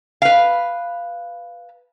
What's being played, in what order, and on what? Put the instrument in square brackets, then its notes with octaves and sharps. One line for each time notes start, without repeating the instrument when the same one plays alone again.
[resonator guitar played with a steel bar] B4 F5